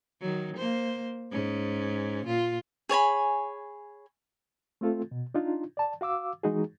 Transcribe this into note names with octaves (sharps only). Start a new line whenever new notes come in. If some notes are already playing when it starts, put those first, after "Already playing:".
D#3 F#3
A#3 C5
G#2 C#4
A#2 F4
G#4 C#5 G#5 B5
A3 C4 F4 A4
B2
D4 D#4 F4
D5 A5
F#4 F5 D6 E6
E3 G#3 D#4 F#4 G#4